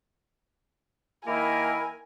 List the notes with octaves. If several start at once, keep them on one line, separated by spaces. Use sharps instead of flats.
D#3 A#3 E4 A#4 G#5